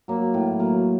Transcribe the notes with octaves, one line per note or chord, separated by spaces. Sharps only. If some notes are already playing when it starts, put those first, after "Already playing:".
F#3 A#3
A2
F#3 A#3